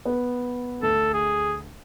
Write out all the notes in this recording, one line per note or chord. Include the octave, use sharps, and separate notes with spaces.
B3
D2 A4
G#4